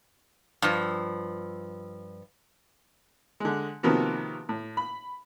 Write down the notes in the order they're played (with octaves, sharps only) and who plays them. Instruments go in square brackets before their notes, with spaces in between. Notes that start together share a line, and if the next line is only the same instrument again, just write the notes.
[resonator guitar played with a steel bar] G2 F3
[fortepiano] D3 G#3
C3 D#3 F3 A#3 B3 F#4
A2
B5